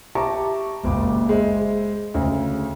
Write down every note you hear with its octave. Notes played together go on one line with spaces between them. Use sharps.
G4 E5 A5 A#5 C#6 D6
F#1 C#2 A#2 D6
G#3 C5 E5
D2 C#3